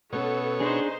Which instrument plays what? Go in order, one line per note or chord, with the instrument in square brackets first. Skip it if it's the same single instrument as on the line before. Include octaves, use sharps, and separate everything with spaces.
[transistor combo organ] B2 C#5 [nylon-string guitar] B3 C#4 [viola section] A4
[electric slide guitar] D4 G#4 [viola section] D#4 C5